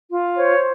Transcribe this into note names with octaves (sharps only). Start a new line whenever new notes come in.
F4
C5 C#5